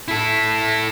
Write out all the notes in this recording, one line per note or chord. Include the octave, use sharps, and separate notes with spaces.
E4 A4